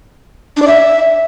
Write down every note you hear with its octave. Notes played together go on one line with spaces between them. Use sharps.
D4
D5
E5